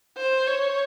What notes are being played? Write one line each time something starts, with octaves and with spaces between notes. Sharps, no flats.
C5
C#5